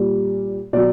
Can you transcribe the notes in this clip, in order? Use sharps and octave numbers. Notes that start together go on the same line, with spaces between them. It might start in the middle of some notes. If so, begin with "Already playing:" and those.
Already playing: A#2 G3
B2 F#3 D5